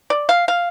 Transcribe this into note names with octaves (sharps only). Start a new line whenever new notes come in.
D5
F5
F5